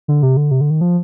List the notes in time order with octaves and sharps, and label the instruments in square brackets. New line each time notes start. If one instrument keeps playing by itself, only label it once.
[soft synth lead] D3
C3
D3
C3
D3
D#3
F3